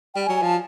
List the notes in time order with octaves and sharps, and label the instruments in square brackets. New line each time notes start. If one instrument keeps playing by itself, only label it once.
[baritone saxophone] G3 [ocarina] G5
[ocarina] G#5
[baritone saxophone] F#3
[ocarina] G#5
[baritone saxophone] F3 [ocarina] A5